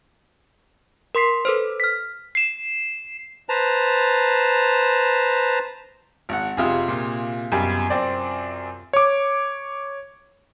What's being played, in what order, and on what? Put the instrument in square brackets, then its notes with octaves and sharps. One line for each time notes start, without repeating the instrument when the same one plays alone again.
[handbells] A#4 C6 B6 C7
A4 B4 C5
F6 B6
[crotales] C7 E7
[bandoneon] B4 C5 A5 A#5
[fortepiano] G#1 F#5
[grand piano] F1 [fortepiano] C3 F4 G#4
[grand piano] A#2
F#2 B2 G3
F#2 C4 D5
[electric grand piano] C#5 D6